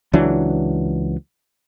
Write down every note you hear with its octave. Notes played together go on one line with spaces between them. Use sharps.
C#2 E3 F#3 D4